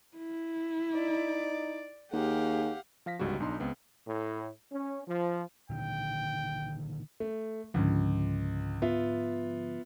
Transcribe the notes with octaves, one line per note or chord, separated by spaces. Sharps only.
E4
D#4 D5
D#2 G4 G#4 F5 F#5
F3 F5 A#6 B6
G1 C#2 G#2 G3 F#4
B1 D4 D#4 C6
C#2 B3 C4
A2
C#4
F3
A#2 D3 D#3 G5
A3
C#2 G#2 D3 F3
B3 F4 E5